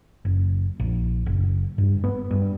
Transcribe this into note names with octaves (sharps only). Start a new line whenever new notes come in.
F#1
A#1
F#1
G2
B3
G2